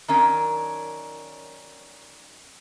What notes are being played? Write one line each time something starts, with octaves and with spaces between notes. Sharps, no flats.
D#3 F#3 C#4 D4 A#4